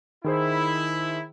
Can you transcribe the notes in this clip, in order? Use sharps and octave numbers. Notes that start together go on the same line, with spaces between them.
D#3 E4 G#4 C5